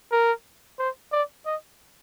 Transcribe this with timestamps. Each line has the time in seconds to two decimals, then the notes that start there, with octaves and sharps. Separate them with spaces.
0.12 A#4
0.79 C5
1.12 D5
1.46 D#5